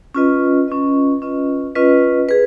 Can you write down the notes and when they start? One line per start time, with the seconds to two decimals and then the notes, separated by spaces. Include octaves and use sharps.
0.15 C#4 F4 B4 D#5
0.68 C#4 F4 B4 D#5
1.22 C#4 F4 B4 D#5
1.75 C#4 F4 B4 D#5
2.29 G#4 B4